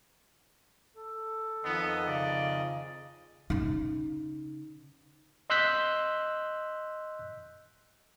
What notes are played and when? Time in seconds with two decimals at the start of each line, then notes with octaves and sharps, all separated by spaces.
0.97 A4
1.65 F2 D#3 B3 D#5
2.07 C#3 D5
3.50 C#3 D#4
5.50 D#5 C6 E6 F#6 G6 B6